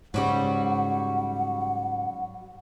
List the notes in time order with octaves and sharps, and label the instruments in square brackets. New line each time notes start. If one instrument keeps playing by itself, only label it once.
[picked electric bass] G#2 C#3 [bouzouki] F#3 G3 F#4 [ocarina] F#5